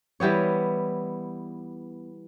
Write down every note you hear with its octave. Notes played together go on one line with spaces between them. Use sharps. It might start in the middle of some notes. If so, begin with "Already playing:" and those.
E3 G3 B3 C#5